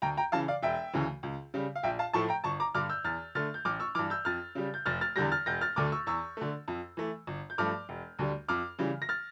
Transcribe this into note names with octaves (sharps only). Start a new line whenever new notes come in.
D2 G5 A#5
G5 A#5
C#3 E3 F5 A5
D5 F5
E1 E5 G5
D2 C#3 E3
C#2
C#3 G3
F5
A#1 E5 G5
F5 A5
A2 F3 A3 A5 C#6
G5 A#5
G1 A5 C#6
A#5 D6
G2 D3 D6 F6
E6 G6
E2 F6 A6
D3 A3 F6 A6
G6
A1 D6 F6
C#6 E6
G2 E3 D6 F6
E6 G6
F2 F6 A6
C#3 G3
G6
F1 F6 A6
F6 A6
E2 D3 G3 G6 A#6
F6 A6
E1 G6 A#6
F6 A6
D2 D3 A3 D6 F6
C#6 E6
E2 C#6 E6
D3 A3
F2
E3 A3
G1
G6
G2 F3 A3 D6 F6
E1
D2 D3 G3
F2 D6 F6
C#3 E3 G3
A#6
F6 A6